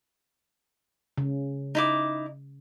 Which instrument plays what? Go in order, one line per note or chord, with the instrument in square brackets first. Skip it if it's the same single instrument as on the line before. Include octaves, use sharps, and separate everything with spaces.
[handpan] C#3
[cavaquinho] D#4 E4 D6